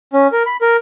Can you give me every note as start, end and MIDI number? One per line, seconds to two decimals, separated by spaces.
0.13 0.27 61
0.32 0.43 70
0.46 0.57 83
0.61 0.77 70